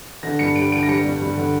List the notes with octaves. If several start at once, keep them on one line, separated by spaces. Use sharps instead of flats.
D3 A#6
G2 C#7
G3 D7
D3 D7
A#6
G3 C#7
G2
G2
D3